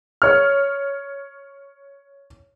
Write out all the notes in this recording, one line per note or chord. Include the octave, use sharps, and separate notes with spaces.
C#5 F6